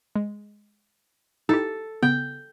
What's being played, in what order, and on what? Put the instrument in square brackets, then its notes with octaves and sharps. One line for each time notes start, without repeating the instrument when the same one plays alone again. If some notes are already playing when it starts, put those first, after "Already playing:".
[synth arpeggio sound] G#3
[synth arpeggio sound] D#4 E4 G4 [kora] A4
[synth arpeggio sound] C#3 B3 [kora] G5